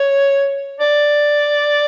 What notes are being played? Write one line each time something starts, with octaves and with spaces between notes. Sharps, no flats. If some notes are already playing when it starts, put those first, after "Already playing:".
Already playing: C#5
D5